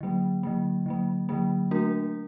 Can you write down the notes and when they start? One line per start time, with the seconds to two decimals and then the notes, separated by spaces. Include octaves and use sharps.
0.01 D3 F#3 A#3
0.43 D3 F#3 A#3
0.86 D3 F#3 A#3
1.29 D3 F#3 A#3
1.71 A3 D4 F#4 A#4